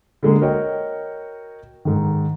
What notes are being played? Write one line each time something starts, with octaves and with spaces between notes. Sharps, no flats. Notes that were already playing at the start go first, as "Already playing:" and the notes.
D3 G#3 A#3
F#4 A#4 C#5 D#5 G5
G#2 D#3